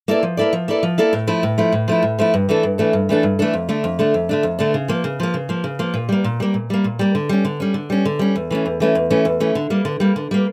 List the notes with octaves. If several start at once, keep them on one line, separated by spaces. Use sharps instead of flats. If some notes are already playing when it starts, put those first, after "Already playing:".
A#3 E4 A4 D5
F3
A#3 E4 A4 D5
F3
A#3 E4 A4 D5
F3
A#3 E4 A4 D5
A2
F3 A3 E4
A2
F3 A3 E4
A2
F3 A3 E4
A2
F3 A3 E4
G2
E3 A3 D4 A4
G2
E3 A3 D4 A4
G2
E3 A3 D4 A4
G2
E3 A3 D4 A4
F2
D3 A3 D4
F2
D3 A3 D4
F2
D3 A3 D4
F2
D3 A3 D4
C#3
F3 A#3
C#3
F3 A#3
C#3
F3 A#3
C#3
F3 A#3
A#2
G3 A#3
A#2
G3 A#3
A#2
G3 A#3
A#2
G3 A#3
D3
G3 C#4
D3
G3 C#4
D3
G3 C#4
D3
G3 C#4
E2
E3 A3 C#4
E2
E3 A3 C#4
E2
E3 A3 C#4
E2
E3 A3 C#4
D3
G3 A#3
D3
G3 A#3
D3
G3 A#3